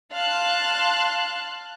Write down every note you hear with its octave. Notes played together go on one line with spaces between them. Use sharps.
F5 A5 C6 F#6